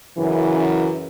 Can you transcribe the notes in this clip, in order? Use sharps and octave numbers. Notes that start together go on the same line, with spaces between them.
F#2 C#3 E3